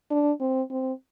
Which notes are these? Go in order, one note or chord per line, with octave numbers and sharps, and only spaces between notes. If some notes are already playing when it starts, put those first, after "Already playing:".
D4
C4
C4